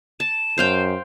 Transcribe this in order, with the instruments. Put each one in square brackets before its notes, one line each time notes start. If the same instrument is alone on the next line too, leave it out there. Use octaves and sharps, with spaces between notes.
[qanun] A5 [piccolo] E7
[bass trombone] F#2 [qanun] C5 F5 G5